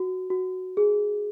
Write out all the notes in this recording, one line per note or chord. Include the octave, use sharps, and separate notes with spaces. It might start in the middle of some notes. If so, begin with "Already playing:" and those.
Already playing: F#4
F#4
G#4